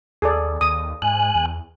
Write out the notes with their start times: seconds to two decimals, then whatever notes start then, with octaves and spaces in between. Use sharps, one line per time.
0.22 D#2 G#4 A4 D5
0.61 D#2 D#6
1.02 G#2 G#5 F#6
1.35 E2